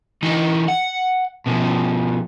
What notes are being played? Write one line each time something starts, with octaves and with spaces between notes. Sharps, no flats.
E3 D#4
F#5
B2 F3